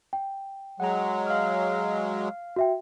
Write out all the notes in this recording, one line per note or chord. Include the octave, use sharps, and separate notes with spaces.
G5
F#3 G#3 F#5 A#5
F5 F6
F#4 E5 G5